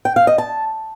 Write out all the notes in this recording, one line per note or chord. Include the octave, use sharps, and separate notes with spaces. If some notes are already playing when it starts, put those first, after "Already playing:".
G5
F5
D#5
A5